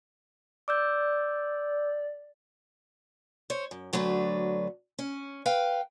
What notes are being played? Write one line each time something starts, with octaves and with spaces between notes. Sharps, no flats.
D5 D6 E6 G6
C5 C#5
F#2
D2 F#3 A3 D4 B4
C#4
B4 F5 G5